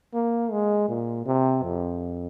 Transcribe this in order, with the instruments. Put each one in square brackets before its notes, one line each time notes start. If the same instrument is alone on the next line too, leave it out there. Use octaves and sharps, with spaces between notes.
[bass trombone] A#3
G#3
A#2
C3
F2